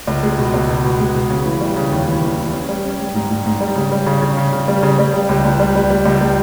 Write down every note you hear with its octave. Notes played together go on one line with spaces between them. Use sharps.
C#2
G#3
B2
C#2
B2
B2
G#3
B2
C#3
E3
G3
C#3
D#2
E3
D#2
E3
C#4
G3
C#4
G3
G#2
G#2
G#2
G3
C#3
G3
C#3
C#3
C#3
C#3
G3
C#3
G3
G3
C#2
C#2
G3
G3
G3
C#2
G3